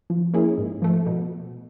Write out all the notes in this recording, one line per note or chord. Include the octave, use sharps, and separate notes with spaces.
F3
A#3 C#4 E4 G#4
G#2
F3 A3
B2